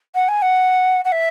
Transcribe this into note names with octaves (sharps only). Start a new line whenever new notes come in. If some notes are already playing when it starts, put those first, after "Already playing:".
F#5
G#5
F#5
F#5
E5